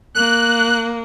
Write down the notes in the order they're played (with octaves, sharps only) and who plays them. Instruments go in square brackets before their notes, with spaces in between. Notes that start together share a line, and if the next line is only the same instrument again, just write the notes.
[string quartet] A#3 [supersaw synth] F#6